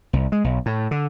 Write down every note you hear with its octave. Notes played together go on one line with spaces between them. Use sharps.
C2
G#3
B1
A2
D3